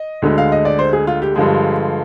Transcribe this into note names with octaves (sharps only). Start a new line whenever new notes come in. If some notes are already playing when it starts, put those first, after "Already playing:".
Already playing: D#5
D2 D3 G#3
F5
D#5
D5
C5
G#4
F4
G4
G2 D3 F3 G#3